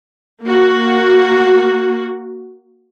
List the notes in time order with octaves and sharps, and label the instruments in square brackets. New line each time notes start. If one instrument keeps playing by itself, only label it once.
[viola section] A#3 F#4